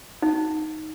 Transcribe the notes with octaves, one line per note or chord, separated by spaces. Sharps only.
D#4